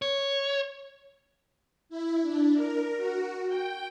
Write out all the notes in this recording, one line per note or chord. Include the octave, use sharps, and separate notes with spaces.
C#5
E4
D4
A#4
F#4
G5